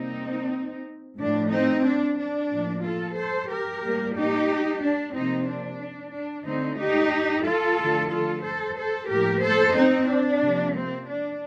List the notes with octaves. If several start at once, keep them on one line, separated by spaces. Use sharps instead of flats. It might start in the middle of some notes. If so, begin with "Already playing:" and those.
Already playing: C3 G3 A#3 C4 D#4
A2 F3 A3 D4
C4 D#4
D4
D4
A2 F3 A#3
F4 A4
A4 C5
G4 A#4
A2 G3 A#3
D#4 G4
D4
C3 F3 A#3 C4 D#4
D4
D4
D3 A3 C4 D#4
D#4 G4
F4 A4
D3 F3 A3
F4 A4
A4 C5
A4 C5
A2 F3 A#3 G4 A#4
A4 C5
C4 D#4
D4
C3 F3 A#3
C4
D4